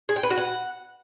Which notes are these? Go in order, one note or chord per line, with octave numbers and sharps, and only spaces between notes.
G#4
G5
B4
F#4
F#5